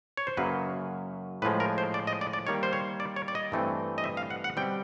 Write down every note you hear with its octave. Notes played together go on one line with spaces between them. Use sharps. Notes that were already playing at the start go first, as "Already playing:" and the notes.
C#5
C5
F#2 C#3 F#3 A#3 B4
A2 F3 G#3 B4
A#4
C5
D5
D#5
D5
D5
D#3 G3 A#3 C#5
C5
C#5
D5
C#5
D5
D#5
G2 E3 A3 C4
D#5
E5
F5
F#5
F#5
B2 G3 C4 G5